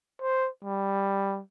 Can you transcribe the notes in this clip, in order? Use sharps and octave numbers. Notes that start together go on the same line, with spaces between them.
C5
G3